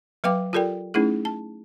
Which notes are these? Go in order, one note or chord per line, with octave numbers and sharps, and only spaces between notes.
F#3 B4 F5 G5 D6
F4 G4 A4 A#4 D5 G5
A3 C#4 D#4 E4 G#4
A5